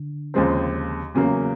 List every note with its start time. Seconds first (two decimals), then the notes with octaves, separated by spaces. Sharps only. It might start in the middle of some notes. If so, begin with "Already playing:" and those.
Already playing: D3
0.34 D#2 C#3 F3 G#3 C4
1.15 E2 C#3 F#3 A#3